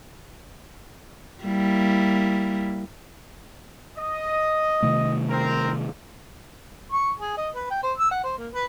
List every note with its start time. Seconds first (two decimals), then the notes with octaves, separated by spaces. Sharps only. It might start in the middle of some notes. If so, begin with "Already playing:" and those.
1.43 G3 A#3 E4
3.98 D#5
4.83 C3 D#3 A3
5.30 C4 A#4
6.92 C#6
7.19 G#4
7.37 D#5
7.55 B4
7.70 G5
7.83 C5
7.98 E6
8.11 F#5
8.23 C5
8.38 A#3
8.54 B4